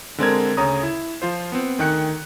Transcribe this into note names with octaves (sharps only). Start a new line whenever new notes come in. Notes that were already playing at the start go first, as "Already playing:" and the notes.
D3 G#3 C4 D4 A#4 G#6
D2 C#3 C#5 A#5 D#6
E4
F3 F4 C5
B3 C4
D2 D#3 G5 F#6 C#7